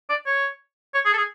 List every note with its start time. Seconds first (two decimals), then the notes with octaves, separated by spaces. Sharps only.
0.09 D5
0.26 C#5
0.94 C#5
1.05 G#4
1.13 A4
1.17 G#4